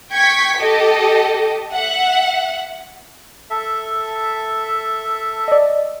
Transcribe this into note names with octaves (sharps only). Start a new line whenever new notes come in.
G5 C#6 G#6 B6
G4 A4 D#5
E5 F#5
A4 E5
D5 D#5